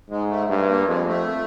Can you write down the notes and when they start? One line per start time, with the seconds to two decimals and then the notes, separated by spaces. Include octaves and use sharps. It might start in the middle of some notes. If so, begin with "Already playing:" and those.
0.10 G#2 G#3
0.30 A3
0.49 G2 A3
0.69 A#3
0.88 F2 G#3
1.07 A3